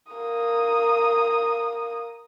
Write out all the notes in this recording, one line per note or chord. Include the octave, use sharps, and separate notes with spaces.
A#3 D#6